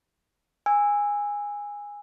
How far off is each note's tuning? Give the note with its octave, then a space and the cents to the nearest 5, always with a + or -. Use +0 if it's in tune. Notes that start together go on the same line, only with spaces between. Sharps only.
G#5 -15 E6 +0